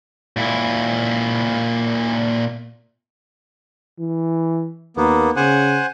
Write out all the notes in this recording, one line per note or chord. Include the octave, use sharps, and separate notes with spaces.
A#2 E4
E3
D#2 A#3 B3
C#3 C5 F#5 G#5